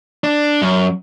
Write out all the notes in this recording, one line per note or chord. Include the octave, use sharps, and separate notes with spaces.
D4
F#2